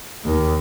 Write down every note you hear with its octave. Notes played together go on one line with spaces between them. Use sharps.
D#2